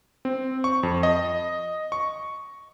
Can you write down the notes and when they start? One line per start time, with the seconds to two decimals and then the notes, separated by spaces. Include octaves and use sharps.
0.25 C4
0.64 C#6
0.83 F2
1.03 D#5
1.92 C#6